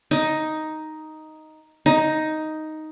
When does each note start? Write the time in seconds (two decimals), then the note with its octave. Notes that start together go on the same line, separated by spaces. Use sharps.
0.11 D#4
1.86 D#4